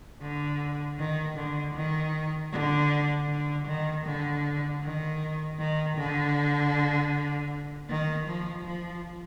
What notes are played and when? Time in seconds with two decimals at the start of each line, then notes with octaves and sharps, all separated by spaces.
0.21 D3
0.98 D#3
1.36 D3
1.74 D#3
2.52 D3
3.29 D3
3.67 D#3
4.05 D3
4.82 D#3
5.58 D#3
5.97 D3
7.89 D#3
8.26 F3
8.65 F3